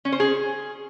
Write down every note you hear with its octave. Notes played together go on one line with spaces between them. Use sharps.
C#4
C5
G#4